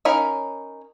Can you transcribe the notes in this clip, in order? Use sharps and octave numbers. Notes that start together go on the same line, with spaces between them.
C#4 D#4 A#4 F5 B5